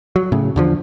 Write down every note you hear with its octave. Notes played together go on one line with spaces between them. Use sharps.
F#3
A2 C#3
E2 D3 F3